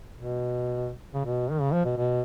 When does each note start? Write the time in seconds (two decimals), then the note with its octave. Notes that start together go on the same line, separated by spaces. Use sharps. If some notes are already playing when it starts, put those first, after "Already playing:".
0.17 B2
1.14 C#3
1.25 B2
1.51 D#3
1.61 C#3
1.73 F3
1.85 B2
1.97 B2